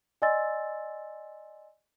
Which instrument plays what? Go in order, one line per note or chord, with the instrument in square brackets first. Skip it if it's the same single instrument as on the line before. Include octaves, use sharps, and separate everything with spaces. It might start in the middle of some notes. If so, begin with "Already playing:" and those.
[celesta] D5 D#5 G#5 C6 E6 A6